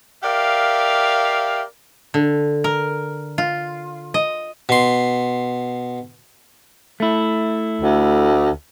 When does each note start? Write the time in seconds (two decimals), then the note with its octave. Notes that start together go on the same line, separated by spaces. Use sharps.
0.23 G4 A#4 D5 E5 F5
2.14 D3
2.64 A#4
3.38 F4
4.14 D#5
4.69 B2 C6
7.00 A3 E4
7.81 D2